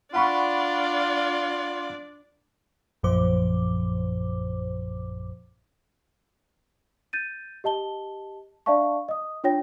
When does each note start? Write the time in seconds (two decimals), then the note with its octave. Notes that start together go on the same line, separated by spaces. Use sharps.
0.14 D4 F4 D5 F#5 B5 C#6
3.03 A#1 F#2 A#2 F3 C5 D6
7.13 G6 A6 D#7
7.64 G4 D#5 A5 G7
8.66 D4 D5 E5 F5 A5 C#6
9.09 D#5 D#6
9.44 D4 F4 C#5 G5 A#6